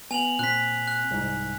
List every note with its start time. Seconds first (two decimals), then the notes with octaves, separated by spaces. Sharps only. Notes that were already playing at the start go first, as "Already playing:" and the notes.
0.11 B3 G#5 F7 F#7
0.39 A#2 C4 F#6 B6
0.88 F#6
1.11 C2 G#2